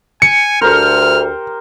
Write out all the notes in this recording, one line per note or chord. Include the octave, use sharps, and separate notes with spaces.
G#5 C#7
D2 G4 A#4 C5 F6